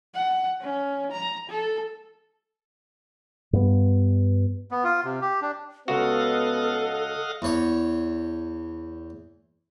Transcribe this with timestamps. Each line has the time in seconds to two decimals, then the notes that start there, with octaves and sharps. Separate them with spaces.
0.14 F#5
0.61 C#4
1.11 A#5
1.49 A4
3.53 G2 B3
4.71 B3
4.84 F4
5.04 C3
5.21 G4
5.42 D4
5.88 C#2 B3 F#4 A4 D#5 F5 F#5
7.42 E2 C#5